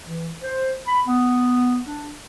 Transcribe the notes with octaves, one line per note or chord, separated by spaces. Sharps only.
E3
C5
B5
B3
D4